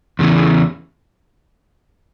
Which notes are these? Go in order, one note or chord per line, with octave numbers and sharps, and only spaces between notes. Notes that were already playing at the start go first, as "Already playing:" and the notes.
E2 C#3 E3